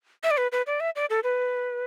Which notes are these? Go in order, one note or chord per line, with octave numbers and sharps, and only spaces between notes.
E5
D5
B4
B4
D5
E5
D5
A4
B4